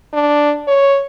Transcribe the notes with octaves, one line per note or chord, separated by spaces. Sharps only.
D4
C#5